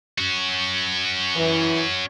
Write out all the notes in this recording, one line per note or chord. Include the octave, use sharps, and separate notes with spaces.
C#4 F#4
E3